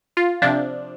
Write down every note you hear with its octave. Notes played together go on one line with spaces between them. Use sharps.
F4
C3 F3 D4